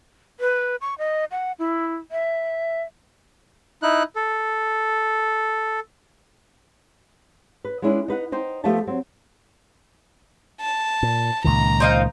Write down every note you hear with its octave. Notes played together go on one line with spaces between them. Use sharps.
B4
C#6
D#5
F#5
E4
E5
D#4 E4 F#6
A4
B4
G#3 B3 C#4 D4 E4
D#4 B4 F#5
D#4 C5 G5
F3 A3 B3 G4 E5 A5
F#3 C4
A5
A#2
C#2 A#2 D#3 A#5
C4 D#4 F5